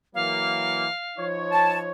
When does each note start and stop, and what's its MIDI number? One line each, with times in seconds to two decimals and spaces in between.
0.15 0.85 52
0.15 0.85 54
0.15 0.85 58
0.15 1.27 77
1.17 1.92 53
1.17 1.92 63
1.17 1.92 73
1.52 1.77 81